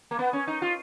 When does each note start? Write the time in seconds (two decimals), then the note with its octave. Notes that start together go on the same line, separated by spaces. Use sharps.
0.11 A#3
0.19 B3
0.33 C#4
0.48 D#4
0.62 F4